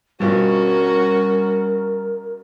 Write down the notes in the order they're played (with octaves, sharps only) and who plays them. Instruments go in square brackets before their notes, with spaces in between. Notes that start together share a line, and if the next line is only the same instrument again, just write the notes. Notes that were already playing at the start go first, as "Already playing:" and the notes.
[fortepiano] G2 B2 F3 [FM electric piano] G3 [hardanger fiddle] C#4 F#4 [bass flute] A#4